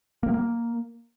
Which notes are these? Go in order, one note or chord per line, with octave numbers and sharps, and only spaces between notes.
A#3
F#3
A#3